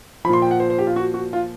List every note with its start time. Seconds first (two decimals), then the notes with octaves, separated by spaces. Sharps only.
0.25 F3 B5
0.29 A#2 C6
0.42 G5
0.51 F#5
0.60 C5
0.70 C5
0.79 G4
0.87 F4
0.96 F#4
1.14 F#4
1.33 F4